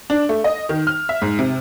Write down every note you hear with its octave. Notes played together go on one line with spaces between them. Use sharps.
D4
A3
D#5
D#3
F6
E5
G#2
C3